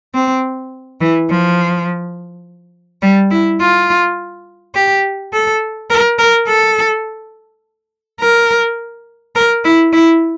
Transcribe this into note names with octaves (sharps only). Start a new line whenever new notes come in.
C4
E3
F3
G3
E4
F4
G4
A4
A#4
A#4
A4
A#4
A#4
E4
E4